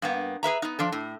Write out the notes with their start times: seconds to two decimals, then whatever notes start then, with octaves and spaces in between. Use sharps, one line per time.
0.02 G2 A#3 B3
0.43 G#4 B4 E5 A#5
0.62 B3 D#4
0.79 F3 D4 A4
0.92 A2